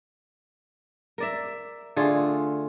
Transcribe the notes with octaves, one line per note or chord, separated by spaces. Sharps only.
A#4 D5 E5
D3 A3 F4 G#4